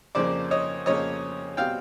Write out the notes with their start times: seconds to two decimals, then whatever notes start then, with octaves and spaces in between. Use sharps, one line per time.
0.15 F2 C#3 F3 A#3 C5 D5
0.51 C#5 D#5
0.86 F2 C#3 F3 A#3 C#5 D#5
1.57 B2 G3 C4 F5 G5